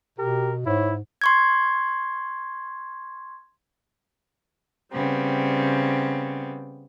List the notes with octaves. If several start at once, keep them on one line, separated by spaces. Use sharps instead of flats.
B2 G4 A#4
G#2 E4 C#5
C6 C#6 G#6
C#3 G3 B3 C4